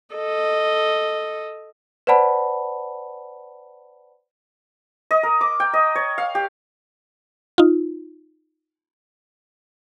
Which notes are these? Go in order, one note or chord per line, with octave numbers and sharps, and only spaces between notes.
A4 D#5
B4 C5 D5 F#5 A5 B5
D#5
A#4
D6
G5
D#5
C#5
F5
G4
D#4 F4